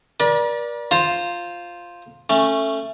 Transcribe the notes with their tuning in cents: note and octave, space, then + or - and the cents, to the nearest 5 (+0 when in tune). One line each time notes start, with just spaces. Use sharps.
A#4 +45 D5 +0 B5 -45
F4 +0 C5 +5 A#5 -25
A3 +10 C#4 -15